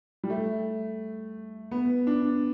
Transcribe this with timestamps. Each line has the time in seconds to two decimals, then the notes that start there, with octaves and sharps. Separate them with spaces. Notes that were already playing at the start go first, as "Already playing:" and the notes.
0.24 G3
0.30 A3
1.71 B3
2.07 D4